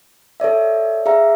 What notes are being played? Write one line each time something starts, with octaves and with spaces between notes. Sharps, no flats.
A4 C#5 D5 E5
G#4 E5 F5 A#5